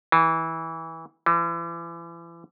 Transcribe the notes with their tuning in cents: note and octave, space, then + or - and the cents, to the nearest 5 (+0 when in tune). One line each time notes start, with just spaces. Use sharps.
E3 -20
E3 +35